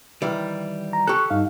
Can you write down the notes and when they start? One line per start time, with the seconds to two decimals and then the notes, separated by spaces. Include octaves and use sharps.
0.22 D#3 E3 G3
0.93 A#5
1.07 G4 A4 C#6 F#6
1.30 G2 D#4 F5